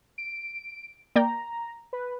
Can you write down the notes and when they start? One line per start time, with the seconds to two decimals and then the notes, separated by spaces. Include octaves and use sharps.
0.18 D7
1.16 A#3 D5 G5 A#5
1.93 B4